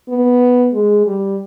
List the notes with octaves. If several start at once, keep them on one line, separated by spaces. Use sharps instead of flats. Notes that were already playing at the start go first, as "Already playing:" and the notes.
B3
G#3
G3